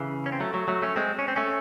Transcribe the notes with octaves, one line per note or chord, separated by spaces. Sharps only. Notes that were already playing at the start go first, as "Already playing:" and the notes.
Already playing: C#3 E3
C#4
C4
F#3 A3
F#3 A3
F#3 A3
A3 C#4
G#3 C4
C#4
C4
A3 C#4